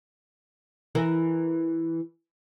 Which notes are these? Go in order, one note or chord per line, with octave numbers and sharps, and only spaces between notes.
E3 E4 A#4